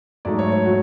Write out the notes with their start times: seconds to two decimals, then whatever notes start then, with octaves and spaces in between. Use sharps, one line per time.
0.25 G#2 F#3 A3 D5
0.39 C#5
0.52 C#5
0.66 F#3 F#4